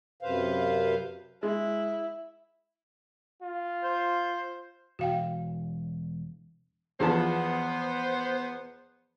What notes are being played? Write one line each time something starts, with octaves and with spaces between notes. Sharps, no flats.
F#2 C3 B4 C5 F5
G#3 E4
F4
C5
E1 F#4 F5 G5
E2 F3 B3 C5 A5